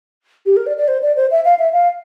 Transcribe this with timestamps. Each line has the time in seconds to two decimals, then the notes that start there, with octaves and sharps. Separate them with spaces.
0.46 G4
0.57 A#4
0.67 D5
0.77 D5
0.88 C5
1.02 D5
1.16 C5
1.31 E5
1.45 F5
1.59 E5
1.73 F5